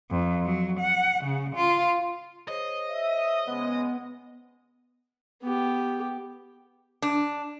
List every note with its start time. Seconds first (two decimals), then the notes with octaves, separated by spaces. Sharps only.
0.11 F2
0.44 F#3
0.80 F#5
1.24 C#3
1.56 F4
2.48 G#4 C5 C#5 D#5
2.90 E5
3.47 C#3 G#3 B3
5.43 B3 G4
7.02 D4